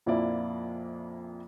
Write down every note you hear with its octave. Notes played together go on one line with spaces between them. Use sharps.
A#1 F2 A#3 E4 D5